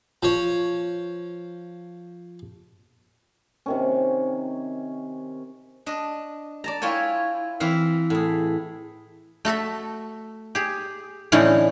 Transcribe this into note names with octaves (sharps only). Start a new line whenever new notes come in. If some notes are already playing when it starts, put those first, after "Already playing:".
F3 C#5
C3 D#3 C#4
D4 D#5
D5 A5 A#5
E4 F4 C#5 G5 G#5
E3 C4 F5
A2 G#4
A3 F#4 A4 E5
G4 G#4
A2 D3 E3 C#4 D#4 F#5